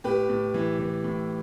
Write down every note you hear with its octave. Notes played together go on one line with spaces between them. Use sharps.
A2 G4 B4
A2
E3
E3
A2